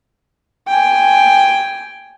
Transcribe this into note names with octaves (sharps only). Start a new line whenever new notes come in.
G5 G#5